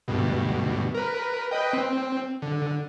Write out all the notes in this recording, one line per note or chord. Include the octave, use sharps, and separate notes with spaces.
D2 G2 B2
A#4 B4
B4 D#5 G5
C4
D3